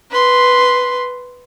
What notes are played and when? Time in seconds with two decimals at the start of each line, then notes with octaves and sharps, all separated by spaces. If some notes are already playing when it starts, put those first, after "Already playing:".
0.11 B4 C6